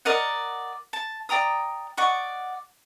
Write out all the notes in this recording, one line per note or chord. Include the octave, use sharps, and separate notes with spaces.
A#4 D5 D#5 F#5
A5
D5 G5 A#5 D#6
D5 D#5 F#5 C#6